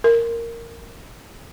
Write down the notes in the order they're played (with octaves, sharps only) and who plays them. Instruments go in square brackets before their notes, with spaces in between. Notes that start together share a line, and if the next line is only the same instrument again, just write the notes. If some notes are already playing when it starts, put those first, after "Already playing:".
[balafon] A#4